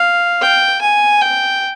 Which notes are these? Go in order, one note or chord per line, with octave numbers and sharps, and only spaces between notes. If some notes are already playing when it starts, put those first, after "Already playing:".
Already playing: F5
G5
G#5
G5